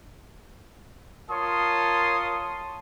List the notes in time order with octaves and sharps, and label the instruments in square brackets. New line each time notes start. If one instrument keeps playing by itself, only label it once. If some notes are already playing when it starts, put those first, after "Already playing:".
[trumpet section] F4 A#4 C#5 A5 C6 D#6